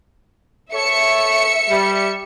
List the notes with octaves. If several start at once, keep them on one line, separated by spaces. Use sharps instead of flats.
A4 C#5 E5 C#7
G3